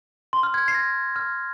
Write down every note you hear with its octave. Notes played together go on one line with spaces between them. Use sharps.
C6
F6
G#6
C7
A#6
F6